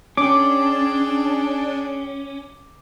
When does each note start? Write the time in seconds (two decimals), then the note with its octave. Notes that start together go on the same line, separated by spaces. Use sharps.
0.17 C#4 D4 G#4 G5 D6